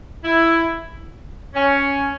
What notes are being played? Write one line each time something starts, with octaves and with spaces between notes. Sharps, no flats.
E4
C#4